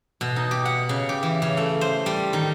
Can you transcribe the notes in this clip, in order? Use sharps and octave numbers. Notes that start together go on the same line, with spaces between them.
B2
D#4
G4
F#5
C#3
G4
E3
C#3
A3
C5
G3
D#3